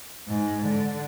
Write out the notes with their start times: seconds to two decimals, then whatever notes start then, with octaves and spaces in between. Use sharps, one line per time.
0.28 G#2
0.67 D3